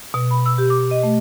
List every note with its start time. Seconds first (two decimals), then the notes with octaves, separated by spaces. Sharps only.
0.14 B2
0.31 B5
0.46 E6
0.58 G4
0.70 D6
0.91 D#5
1.03 A3